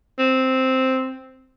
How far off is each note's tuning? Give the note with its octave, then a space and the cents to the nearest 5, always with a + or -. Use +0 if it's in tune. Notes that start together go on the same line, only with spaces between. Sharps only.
C4 +0